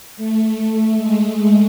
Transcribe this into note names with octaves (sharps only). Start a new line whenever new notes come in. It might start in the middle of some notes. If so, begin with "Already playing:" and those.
A3
G#3